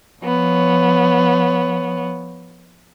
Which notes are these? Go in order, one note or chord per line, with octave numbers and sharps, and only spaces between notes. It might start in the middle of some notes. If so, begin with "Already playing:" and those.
F3 B3 C#5